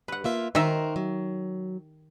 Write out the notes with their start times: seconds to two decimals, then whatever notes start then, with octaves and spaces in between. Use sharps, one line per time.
0.08 G2 B4 F#5
0.24 A#3 F4 E5
0.55 D#3 F#4 A#4 C5 D#5 E5
0.96 F#3